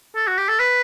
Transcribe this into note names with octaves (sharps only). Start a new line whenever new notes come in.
A4
F#4
G4
A4
B4